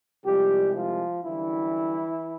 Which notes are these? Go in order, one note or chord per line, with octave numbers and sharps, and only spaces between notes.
C2 C3 F3 G3 G#3 G4
F3 F4
F#2 D3 E3 G3 E4